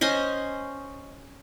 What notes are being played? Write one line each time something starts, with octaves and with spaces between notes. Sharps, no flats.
C#4 C5 D#5 G#5